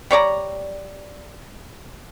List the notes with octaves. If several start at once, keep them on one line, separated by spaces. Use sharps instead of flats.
G3 C#5 D5 A#5